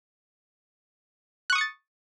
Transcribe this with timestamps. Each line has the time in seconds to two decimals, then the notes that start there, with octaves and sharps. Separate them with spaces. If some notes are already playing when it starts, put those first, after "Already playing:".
1.50 F#6
1.53 C#6
1.55 D#6
1.58 C#7
1.61 A6